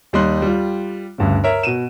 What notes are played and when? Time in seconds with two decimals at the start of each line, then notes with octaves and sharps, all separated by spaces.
0.13 D#2 G3 D#4 C6 F#6
0.42 G3 F4
1.18 D2 G2 C#3
1.44 A#4 C#5 E5
1.63 B2 D#7 E7